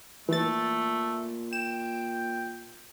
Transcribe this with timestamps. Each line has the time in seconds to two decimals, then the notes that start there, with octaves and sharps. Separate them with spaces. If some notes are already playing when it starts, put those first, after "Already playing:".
0.29 A#2 E3 A3 A6
1.53 G5 E7